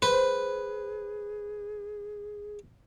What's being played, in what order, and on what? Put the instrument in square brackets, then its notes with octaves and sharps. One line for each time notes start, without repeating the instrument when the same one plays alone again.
[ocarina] G#4 [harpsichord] B4 [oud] C5